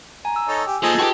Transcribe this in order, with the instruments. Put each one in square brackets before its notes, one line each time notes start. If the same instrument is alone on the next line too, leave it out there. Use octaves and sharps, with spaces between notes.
[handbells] G#5 [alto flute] A#5
[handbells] E6
[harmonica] D#4 A4 C#5
[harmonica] G4 [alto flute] G#5
[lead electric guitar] A#3 C5 [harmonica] D#4 G#4 A4 [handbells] F4
[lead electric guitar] F#4 G4 [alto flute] B4 [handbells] G5 A5 C6